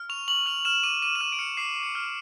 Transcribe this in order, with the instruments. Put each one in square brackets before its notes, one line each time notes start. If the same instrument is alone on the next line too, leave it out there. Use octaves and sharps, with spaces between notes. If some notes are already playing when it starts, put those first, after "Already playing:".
Already playing: [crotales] F6
C#6 F7
C#6 F#7
F6 F7
F6 E7
D6 D#7
D6 D#7
E7
F6 D#7
D7
F6 C#7
D6 C7
D6
C#7
F6